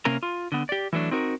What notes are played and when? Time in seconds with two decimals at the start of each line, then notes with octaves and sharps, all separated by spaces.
0.05 C3 A#3 C#4 A#4 A#5
0.23 F4
0.52 D3 B3
0.69 G4 D5
0.93 E3 F#3 A3 D4
1.11 C4 D#4 F#4 A#4